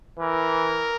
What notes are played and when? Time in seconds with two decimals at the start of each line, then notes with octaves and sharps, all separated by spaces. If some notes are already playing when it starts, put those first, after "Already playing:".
0.20 E3 A#4